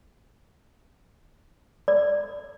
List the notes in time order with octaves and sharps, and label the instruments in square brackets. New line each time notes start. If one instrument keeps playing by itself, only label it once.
[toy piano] D5